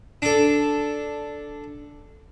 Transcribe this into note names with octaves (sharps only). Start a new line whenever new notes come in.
D4 A4